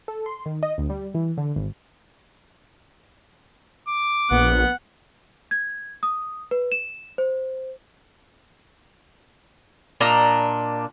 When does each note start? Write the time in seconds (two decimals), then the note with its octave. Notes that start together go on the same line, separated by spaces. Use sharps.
0.08 A4
0.26 C6
0.46 D#3
0.63 D#5
0.78 D2
0.90 G3
1.15 E3
1.37 D3
1.56 G#1
3.89 D6
4.31 A#1 B3 F#5
5.51 G#6
6.03 D#6
6.51 B4
6.72 E7
7.18 C5
10.00 A#2 D4 D#5 A#5